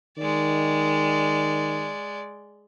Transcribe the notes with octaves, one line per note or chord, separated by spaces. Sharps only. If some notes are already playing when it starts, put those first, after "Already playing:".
D#3 G#3 D5